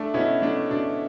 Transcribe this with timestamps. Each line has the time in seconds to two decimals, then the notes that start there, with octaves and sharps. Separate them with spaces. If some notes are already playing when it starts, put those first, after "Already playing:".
Already playing: A3 D4
0.14 B2 C#4 E4
0.42 A3 D4
0.70 B2 D4